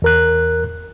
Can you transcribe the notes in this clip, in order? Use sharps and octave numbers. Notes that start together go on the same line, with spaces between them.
E2 A#4 F#6